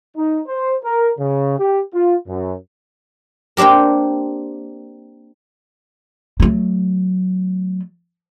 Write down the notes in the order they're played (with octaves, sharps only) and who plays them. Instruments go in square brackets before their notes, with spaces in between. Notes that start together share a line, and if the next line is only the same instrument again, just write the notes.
[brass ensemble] D#4
C5
A#4
C#3
G4
F4
F#2
[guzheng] A#3 C4 D4 G4 A#4
[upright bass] F#3 A3